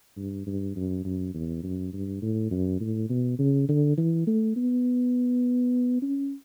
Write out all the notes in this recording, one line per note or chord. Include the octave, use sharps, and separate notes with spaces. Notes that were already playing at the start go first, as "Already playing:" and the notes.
G2
G2
F#2
F#2
E2
F#2
G2
A2
F#2
A2
B2
C#3
D3
E3
A3
B3
C#4